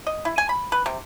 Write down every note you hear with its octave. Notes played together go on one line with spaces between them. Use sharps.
D#5
E4
G#5
B5
B4
C3